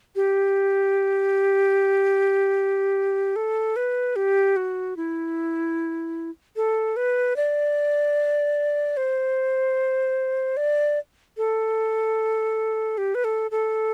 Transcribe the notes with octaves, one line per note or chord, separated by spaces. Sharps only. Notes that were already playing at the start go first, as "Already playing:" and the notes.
G4
A4
B4
G4
F#4
E4
A4
B4
D5
C5
D5
A4
G4
B4
A4
A4